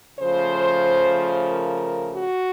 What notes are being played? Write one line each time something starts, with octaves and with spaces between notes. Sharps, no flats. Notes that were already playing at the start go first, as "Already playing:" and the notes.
C#3 F3 A3 C5
A#4
F#4